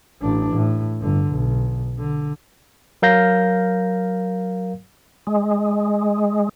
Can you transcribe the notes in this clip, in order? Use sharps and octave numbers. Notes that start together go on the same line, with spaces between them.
A1 D4
A2
G1 D3
B1
D3
F#3 A#4 F5 G6 A#6
G#3